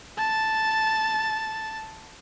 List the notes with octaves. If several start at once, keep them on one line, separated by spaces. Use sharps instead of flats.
A5 A6